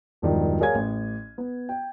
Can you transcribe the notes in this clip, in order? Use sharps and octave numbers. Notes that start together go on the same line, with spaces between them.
E1 G2 D#3 F3
G#4 A#4 C#5 F5 G#5 G#6
A1
B3
G5